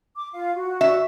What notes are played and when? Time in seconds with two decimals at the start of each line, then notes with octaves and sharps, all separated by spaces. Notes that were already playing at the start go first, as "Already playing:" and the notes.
0.16 D6
0.32 F4 F5
0.55 F#4
0.81 E5